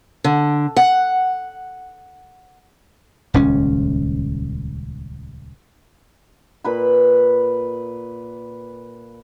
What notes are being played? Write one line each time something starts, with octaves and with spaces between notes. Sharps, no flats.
D3
F#5
D#1 C#2 C#4
A#2 B4 B5